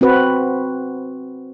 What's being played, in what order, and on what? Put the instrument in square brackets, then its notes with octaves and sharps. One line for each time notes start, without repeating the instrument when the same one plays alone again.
[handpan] C4 F#4 B4